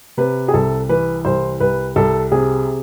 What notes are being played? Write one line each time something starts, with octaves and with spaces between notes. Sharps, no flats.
C3 B4
G#4
C2 A4
E3 B4
C2 C5
C2 B4
C2 A4
C3 G#4